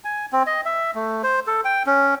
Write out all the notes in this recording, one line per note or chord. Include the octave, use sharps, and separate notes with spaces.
G#5
C4
D#5
E5
A3
C5
A4
G5
C#4